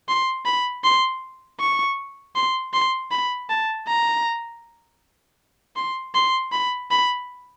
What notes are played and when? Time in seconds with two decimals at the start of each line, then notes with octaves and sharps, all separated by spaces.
0.09 C6
0.46 B5
0.84 C6
1.60 C#6
2.36 C6
2.73 C6
3.11 B5
3.50 A5
3.88 A#5
5.77 C6
6.15 C6
6.52 B5
6.91 B5